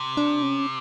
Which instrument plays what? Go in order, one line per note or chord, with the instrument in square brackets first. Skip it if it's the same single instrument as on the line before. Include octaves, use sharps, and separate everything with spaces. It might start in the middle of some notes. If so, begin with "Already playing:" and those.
Already playing: [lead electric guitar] C3
[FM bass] D4
C#4